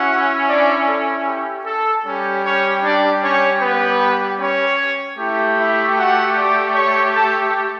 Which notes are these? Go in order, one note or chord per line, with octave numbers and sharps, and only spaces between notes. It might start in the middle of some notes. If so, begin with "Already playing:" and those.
Already playing: C#4 E4 F#4 F#5
D4 D5
A4
G4
A4
G3 C#4 G4
C#4 C#5
D4 D5
C#4 C#5
B3 B4
C#4 C#5
A3 E4 G4
E4 E5
F#4 F#5
D5 D6
C#5 C#6
A4 A5